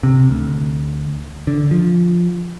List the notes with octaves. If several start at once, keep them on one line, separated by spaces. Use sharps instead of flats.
C3
D2
D3
F3